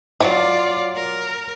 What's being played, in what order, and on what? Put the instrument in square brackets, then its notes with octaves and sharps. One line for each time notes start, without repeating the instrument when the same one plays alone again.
[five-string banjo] E3 F#3 [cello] F4 D5
[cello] A#4